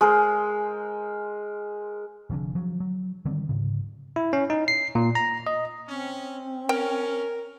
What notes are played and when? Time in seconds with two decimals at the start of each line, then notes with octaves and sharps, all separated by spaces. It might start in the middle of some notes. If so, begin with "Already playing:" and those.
0.01 G#3 A#4 C5
2.30 F1 F2 D3
2.55 F3 F#3
2.80 F#3
3.25 D3 D#3 G3 C4
3.49 G#2 C#3
4.16 E4
4.33 C#4
4.50 D#4
4.68 C7
4.95 A#2
5.15 A#5
5.47 D#5
5.88 C4 C#4
6.69 C#4 A#4 G5